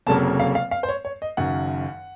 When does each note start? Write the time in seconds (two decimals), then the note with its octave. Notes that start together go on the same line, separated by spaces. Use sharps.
0.07 F1 F2 C#3 F#3 A#3 A5
0.40 F5
0.55 F5
0.71 F5
0.83 C5
0.89 C#5
1.05 C#5
1.22 D#5
1.37 F#1 F#2 D#3 F#5